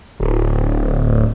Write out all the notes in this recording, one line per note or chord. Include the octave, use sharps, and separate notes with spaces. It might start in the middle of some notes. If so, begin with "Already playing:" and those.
D1